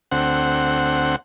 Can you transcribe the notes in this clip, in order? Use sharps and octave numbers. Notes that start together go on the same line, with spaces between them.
D2 C4 F#5